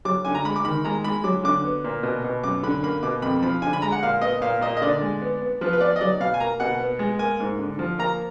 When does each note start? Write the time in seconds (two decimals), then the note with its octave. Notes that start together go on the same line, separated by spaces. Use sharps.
0.05 F#3 D6
0.25 D3 G#5
0.35 A#5
0.45 G#3 B5
0.56 D6
0.65 D#3 B5
0.85 G#3 A#5
1.04 G#3 B5
1.24 F#3 D6
1.44 D3 D6
1.64 B3
1.84 A#2
2.03 B2
2.24 B2
2.43 F#2 D6
2.63 D3 B5
2.83 A#3 B5
3.03 B2 D6
3.22 F2 B5
3.42 F3 B5
3.62 D3 G#5
3.73 B5
3.82 G#3 A#5
3.92 F#5
4.03 A#2 F5
4.21 B3 D#5
4.42 A#2 F5
4.61 A#2 D#5
4.77 D#5
4.82 D3 D5
5.01 G#3
5.22 B3
5.42 B3
5.61 F3 B4
5.73 B4
5.80 B3 D5
5.96 D#5
6.01 F#3 D5
6.20 B2 F5
6.34 G#5
6.40 A#3 A#5
6.60 B2 F#5
6.80 B3
6.99 G#3
7.19 A#3 G#5
7.40 G#2
7.59 D3
7.79 F3
7.98 A#3 A#5